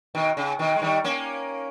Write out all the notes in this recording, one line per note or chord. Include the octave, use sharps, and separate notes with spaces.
B2 D#3
C#3
B2 D#3
G#3
D#3 G3
A#3 C#4